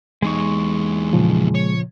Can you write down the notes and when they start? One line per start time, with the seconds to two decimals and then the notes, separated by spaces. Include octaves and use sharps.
0.22 E2 G#3 D#4 C#6
1.13 A#2 C#3 F3
1.55 C#5